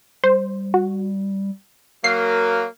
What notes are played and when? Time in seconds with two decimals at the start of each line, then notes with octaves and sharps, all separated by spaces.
0.24 G3 C5
0.74 F#4
2.04 F#3 A#3 F6 C7